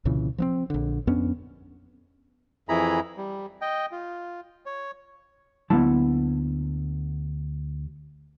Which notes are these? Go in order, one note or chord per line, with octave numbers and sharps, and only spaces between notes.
C2 A#2 C#3 E3
F3 B3 C4
A#1 D3
F2 B3 C#4 D4
F2 E3 E4 G#4 A#5 B5
G3
D#5 G5
F4
C#5
D2 F#3 A#3 B3 E4 A5